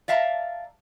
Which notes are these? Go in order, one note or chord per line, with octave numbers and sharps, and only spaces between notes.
D5 E5 F5 A5 A#5